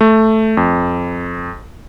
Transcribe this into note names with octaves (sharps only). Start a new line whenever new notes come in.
A3
F2